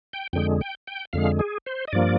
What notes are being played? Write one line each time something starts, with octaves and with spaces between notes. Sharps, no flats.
G5
F2 D3 G#3 G5
G5
G5
F2 D3 G#3 F5
G#4
C5
D#5
G2 F3 A#3 D5